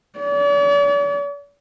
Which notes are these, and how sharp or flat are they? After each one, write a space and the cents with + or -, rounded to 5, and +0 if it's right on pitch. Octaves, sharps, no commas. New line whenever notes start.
D5 -45